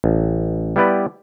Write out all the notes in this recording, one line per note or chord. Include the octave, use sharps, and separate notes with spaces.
A1
G3 B3 E4 G4 B4 D5